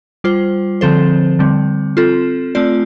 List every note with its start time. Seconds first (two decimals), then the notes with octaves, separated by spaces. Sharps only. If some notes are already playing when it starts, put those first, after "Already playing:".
0.24 G3 F4 C5
0.81 D3 F3 C4 A4 C5
1.39 D3 G3 C4
1.97 C4 F4 A4
2.55 A3 C4 F4 D5